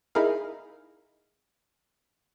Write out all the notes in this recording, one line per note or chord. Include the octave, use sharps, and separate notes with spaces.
D#4 E4 G#4 A#4 F5